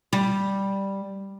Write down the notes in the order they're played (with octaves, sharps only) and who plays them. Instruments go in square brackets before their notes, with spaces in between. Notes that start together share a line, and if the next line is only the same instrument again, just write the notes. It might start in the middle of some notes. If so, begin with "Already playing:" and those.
[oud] G3